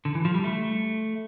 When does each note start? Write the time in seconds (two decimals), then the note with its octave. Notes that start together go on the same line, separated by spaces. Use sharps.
0.05 D3
0.15 E3
0.25 F3
0.34 G3
0.44 A3